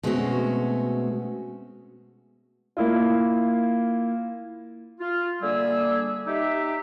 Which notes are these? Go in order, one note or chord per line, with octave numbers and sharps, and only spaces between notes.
B2 G#3 A3 C4 C#4 F#4
A#3 E4 F4
F4
D3 G3 A#3 G#4 E5 E6
D#4 G4 E5